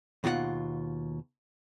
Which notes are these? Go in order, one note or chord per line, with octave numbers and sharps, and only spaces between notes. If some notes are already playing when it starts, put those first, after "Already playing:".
D#2 B2 F4 F#4 F#5